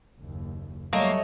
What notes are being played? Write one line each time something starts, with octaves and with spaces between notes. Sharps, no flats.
F#1 D#2
F#3 G3 A3 A#3 C#5 D#5